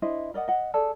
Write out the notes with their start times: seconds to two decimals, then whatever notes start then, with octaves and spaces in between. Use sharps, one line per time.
0.02 D4 E4 C5 D#5
0.34 A#4 D5 D#5 F#5
0.48 D#5 F#5
0.74 G#4 A4 D5